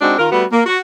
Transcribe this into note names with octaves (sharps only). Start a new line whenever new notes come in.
G#3 C4 D4 D#4 F#4
D#3 F4 A#4
G3 A3 B3 F#4
A#3
F#4